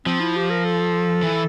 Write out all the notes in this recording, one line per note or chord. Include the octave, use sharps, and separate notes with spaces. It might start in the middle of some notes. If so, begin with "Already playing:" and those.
F3 C4
E4
G4
A#4
A4
E3